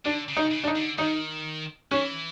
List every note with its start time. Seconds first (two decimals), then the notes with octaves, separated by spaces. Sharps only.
0.05 D3 D4
0.28 C#3
0.37 D#4
0.51 C#3
0.64 D4
0.67 D#4
0.75 D3
0.98 D#3 D#4
1.91 E3 C#4